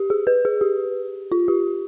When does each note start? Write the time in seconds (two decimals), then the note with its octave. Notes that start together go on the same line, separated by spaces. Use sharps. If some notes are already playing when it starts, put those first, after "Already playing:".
Already playing: G4
0.10 G#4
0.27 B4
0.45 G#4
0.61 G4
1.32 F4
1.48 G4